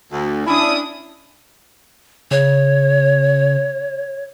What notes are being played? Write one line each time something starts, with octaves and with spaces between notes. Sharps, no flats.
D2
C#4 D4 E4 D#6
C#3 C#5